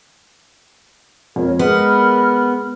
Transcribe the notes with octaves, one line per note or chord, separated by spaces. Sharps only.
F2 A#4 C#5
G#3 B3 A#4 B5 F6